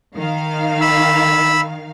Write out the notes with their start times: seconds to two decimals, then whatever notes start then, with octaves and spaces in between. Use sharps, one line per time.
0.16 D#3 F5
0.81 B5 E6